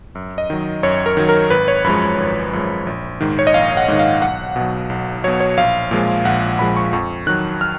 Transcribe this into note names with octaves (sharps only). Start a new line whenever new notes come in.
F#2
D#5
D#3 F#3
F#2 C#5
A#4
D#3 F#3
A#4
G#1 B4
C#5
F#2 F3 G#3 B5
B5
G#1
F#2 F3 G#3
A#1
G#2 D#3
C#5
D#5
A#1 F5
F#5
G#2 D#3
F5
B1 F#5
B2
F#3
B1
B2 F#3 C#5
C#5
A#1 F5
A#2 F3 G#3
A#1 F#5
A#2 F3 G#3 B5
C#6
F2 C#6
D#3 F#3 F#6
F6